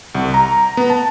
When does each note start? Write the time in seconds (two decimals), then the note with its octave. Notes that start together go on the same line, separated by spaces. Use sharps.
0.15 C2
0.34 A#5
0.77 B3
0.90 A5